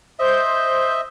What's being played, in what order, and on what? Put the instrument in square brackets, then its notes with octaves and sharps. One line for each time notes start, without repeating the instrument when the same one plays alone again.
[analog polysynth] C5 G6 [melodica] D#5 E5